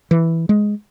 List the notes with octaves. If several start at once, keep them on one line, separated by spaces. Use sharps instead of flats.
E3
G#3